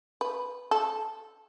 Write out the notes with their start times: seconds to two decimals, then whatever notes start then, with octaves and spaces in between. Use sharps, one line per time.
0.21 B4
0.71 A4